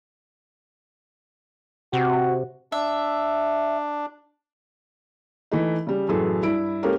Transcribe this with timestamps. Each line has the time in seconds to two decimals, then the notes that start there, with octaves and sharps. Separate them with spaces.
1.93 C3 F#4
2.72 D4 E5
5.51 E3 A3 D#4
5.87 C#3 G3
6.08 A1 F#2 G#4 A4
6.43 G2 E4 E5 D7
6.83 G#3 A#3 C#4 G4 A4 A#4